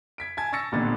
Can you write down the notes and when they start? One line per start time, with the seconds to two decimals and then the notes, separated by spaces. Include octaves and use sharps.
0.18 G#6 B6 D7
0.37 G#5 A5 G#6
0.53 C#6 E6 A6 A#6 C#7
0.72 A1 A#2 D3 B3 A6